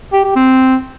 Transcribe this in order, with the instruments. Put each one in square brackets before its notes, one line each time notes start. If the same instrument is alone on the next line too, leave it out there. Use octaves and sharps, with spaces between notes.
[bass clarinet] G4
G4
C4